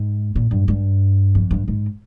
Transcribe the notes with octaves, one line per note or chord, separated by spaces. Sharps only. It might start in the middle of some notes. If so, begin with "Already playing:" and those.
Already playing: G#2
A#2
G2
G2
F2
G2
G#2